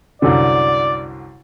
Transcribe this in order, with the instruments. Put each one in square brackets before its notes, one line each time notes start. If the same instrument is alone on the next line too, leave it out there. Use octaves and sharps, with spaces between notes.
[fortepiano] C2 F#2 D3 [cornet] D5